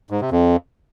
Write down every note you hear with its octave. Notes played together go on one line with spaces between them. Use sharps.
G#2
C3
F2